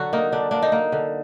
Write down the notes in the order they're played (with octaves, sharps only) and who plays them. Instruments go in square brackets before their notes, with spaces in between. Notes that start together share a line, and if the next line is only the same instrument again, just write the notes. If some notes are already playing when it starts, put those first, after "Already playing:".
Already playing: [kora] D3 F#3 F#4
A#3 D#4
D3 D4
A#3 D4
D#4
A#3
D3